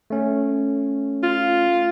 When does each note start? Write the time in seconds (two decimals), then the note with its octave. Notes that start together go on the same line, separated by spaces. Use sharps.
0.10 A3 C#4
1.23 F4